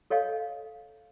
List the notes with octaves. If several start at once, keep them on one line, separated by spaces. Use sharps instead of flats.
A4 C#5 D#5 F5